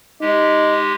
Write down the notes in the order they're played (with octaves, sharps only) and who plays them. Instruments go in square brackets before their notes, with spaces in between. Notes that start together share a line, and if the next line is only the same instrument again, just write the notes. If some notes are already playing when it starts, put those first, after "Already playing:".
[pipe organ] G#3 G4 [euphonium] D#4